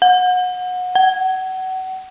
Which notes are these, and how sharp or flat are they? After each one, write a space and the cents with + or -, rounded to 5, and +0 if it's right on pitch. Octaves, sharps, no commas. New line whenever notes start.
F#5 -25
F#5 +30